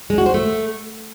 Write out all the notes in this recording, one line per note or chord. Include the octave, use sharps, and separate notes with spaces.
G#3
F#4
C5
A3